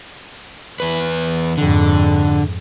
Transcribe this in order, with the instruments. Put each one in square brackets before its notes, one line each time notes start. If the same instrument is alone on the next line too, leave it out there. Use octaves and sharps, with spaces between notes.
[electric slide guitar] E2 B4
[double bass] F2 G#2 [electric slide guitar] D3